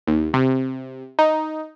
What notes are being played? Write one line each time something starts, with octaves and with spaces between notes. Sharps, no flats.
D#2
C3
D#4